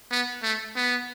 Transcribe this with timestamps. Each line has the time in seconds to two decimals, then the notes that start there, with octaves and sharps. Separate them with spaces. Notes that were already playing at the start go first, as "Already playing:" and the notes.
0.11 B3
0.43 A3
0.76 B3